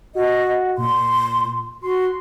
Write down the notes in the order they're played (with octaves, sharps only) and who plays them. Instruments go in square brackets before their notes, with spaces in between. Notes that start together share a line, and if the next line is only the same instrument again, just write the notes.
[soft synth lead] F#4 [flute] D#5
[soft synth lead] A#2 [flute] C6
[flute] F#4 [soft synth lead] C6